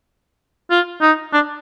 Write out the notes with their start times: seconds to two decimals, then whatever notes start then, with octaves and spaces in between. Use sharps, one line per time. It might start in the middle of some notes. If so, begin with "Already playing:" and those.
0.70 F4
1.02 D#4
1.33 D4